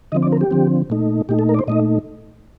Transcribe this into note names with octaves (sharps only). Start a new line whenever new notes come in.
D3 F3 C4 D#5
D5
A#4
G4
D3 F3 C4
A#2 A3 D#4
A#2 A3 D#4 G4
A4
A#4
D5
C5
A#2 A3 D#4 D#5